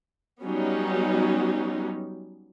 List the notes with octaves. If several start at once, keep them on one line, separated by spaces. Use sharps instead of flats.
F#3 G3 B3 C#4 D#4